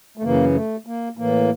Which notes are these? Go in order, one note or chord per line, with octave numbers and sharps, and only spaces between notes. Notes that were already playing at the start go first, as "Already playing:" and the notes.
A3
F#2 C#3 E3 A#3
A3
A#3
A2 E3 A#3